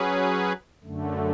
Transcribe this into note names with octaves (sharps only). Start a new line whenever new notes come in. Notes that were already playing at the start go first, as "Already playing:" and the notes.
Already playing: F#3 C#4 G#4 B4
F#2 D3 A3